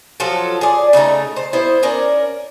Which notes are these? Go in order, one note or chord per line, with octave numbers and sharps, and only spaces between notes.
F3 F#3 F4 A4
G#4 D5
C#3 A3 D#4 A#5
C5
B3 E4 C5
C#4 A#4 D5